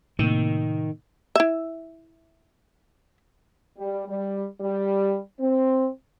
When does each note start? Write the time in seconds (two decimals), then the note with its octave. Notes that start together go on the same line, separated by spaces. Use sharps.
0.19 A2 C3 D#3 A#3
1.36 E4 E5
3.77 G3
4.07 G3
4.60 G3
5.40 C4